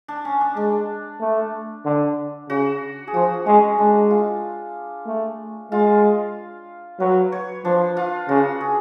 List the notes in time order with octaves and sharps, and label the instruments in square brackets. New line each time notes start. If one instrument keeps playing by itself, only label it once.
[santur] D4
C#4
D4
[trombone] G#3 [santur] D4
[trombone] A3
D3
[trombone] C#3 [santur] F#4
[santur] G#4
[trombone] F3 [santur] F#4
[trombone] G#3 [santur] C#4
[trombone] G#3 [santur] D4
[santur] F4
[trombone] A3
[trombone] G#3 [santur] F4
[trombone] F#3 [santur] B4
[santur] C#5
[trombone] F3 [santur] D4
[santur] F4
[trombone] C#3 [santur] F#4
[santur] G#4